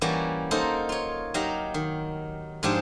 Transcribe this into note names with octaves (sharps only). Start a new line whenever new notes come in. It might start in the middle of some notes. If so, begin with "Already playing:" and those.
E3 G3 A#3 C#4 F#4 D5
A#3 D#4 A4 A#4 C5
F4 C#5
F#3 D#4 G4 F5 A#5
D#3
G#2 F3 D4 G4 G#4